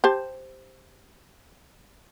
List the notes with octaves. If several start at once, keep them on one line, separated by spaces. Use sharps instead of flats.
G4 C5 A5